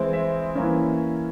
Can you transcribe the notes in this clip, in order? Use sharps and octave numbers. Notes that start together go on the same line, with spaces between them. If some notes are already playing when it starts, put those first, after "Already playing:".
Already playing: E3 G#3 C4 E4
E5
E3 A#3 C#4